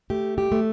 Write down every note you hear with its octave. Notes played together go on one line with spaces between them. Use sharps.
A3 G4
G4
A3